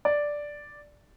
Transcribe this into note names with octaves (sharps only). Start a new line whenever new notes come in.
D5